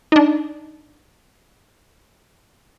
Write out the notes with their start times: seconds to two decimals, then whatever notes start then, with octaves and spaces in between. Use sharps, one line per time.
0.12 D4 D#4